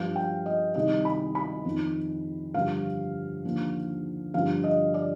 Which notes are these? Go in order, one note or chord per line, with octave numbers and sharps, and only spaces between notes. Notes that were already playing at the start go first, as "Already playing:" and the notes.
Already playing: G2 F3 F5
G5
D#5
C2 C3 D#3 D#5
B5
B5
F2 D#3
G2 D3 F3 F5
D#2 D3 F3
G2 D3 F3 F5
D#5
D5